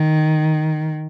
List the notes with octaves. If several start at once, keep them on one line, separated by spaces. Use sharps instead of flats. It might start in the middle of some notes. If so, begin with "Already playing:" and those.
Already playing: D#3